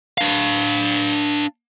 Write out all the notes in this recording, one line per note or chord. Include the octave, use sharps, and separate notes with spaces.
D4 F5